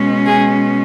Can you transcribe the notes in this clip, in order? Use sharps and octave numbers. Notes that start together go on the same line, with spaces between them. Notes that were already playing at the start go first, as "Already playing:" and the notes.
Already playing: B2 G#3 C#4
G#4